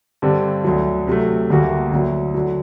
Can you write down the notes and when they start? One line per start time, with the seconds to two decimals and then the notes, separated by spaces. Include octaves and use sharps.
0.22 G2 D3 G3 C4
0.64 D2 D3 F#3
1.07 C3 F#3 A3
1.50 D2 D3 G3 A#3 F#4
1.92 D2 D3 F#3
2.34 D3 F#3